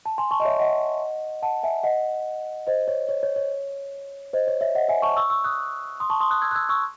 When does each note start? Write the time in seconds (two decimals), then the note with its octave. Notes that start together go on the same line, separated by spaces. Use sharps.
0.06 A5
0.18 G#5 C6
0.31 A5 C#6
0.40 D#5
0.45 C#5 E5
0.59 D#5 F#5
1.43 F#5 A5
1.63 E5 G#5
1.83 D#5 F#5
2.67 C5 D#5
2.88 C#5
3.09 C#5
3.23 C#5
3.36 C#5
4.33 C5 D#5
4.48 C#5
4.61 C#5 E5
4.75 D#5 F#5
4.89 E5 G#5
5.02 A5 C#6
5.17 C#6 E6
5.30 C#6 E6
5.44 D#6 F#6
6.00 C6 D#6
6.10 A5 C#6
6.20 C6 D#6
6.31 D#6 F#6
6.42 E6 G#6
6.51 F#6
6.55 E6 G#6
6.69 C#6 E6